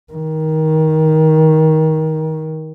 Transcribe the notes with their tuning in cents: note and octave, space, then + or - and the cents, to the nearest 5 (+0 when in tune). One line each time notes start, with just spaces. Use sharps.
D#3 +20